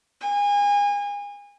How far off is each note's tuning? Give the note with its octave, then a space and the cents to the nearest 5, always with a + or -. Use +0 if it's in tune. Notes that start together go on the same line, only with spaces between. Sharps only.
G#5 -30